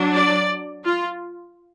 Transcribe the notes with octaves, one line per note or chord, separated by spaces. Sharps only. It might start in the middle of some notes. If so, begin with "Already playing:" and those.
Already playing: F#3 D4
D5
F4